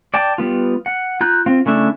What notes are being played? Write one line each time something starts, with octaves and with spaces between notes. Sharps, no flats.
D5 G5 A5
G3 B3 F4
F#5
F4 A#5 F#6 G6
C4 F4
C#3 A3 D4 E4 E5